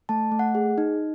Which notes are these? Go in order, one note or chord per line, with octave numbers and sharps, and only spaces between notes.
A3 A5
A3
F#5
G#4
D#4